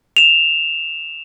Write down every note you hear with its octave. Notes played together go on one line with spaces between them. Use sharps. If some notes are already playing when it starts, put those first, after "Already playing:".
E7 F7